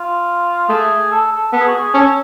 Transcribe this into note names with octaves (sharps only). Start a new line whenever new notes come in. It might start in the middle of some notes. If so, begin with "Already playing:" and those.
Already playing: F4
A3 G#4
A4
A4
B3 A4
G#4
F#4
G#4
C#4 A4